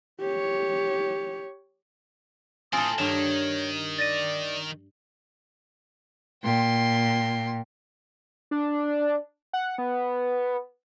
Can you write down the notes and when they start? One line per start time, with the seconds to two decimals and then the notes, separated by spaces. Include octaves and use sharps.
0.20 G4 C#5
2.73 A2 C4 F4 A4 G#5 D#6
2.98 G2 D#3 D4 C#5 G5 E7
3.99 D5 A6 A#6 D#7
6.44 A#2 G5 C6
8.51 D4
9.53 F#5
9.78 B3